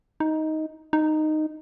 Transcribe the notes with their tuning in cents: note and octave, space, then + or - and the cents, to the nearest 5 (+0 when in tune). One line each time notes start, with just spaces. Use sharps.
D#4 +10
D#4 -10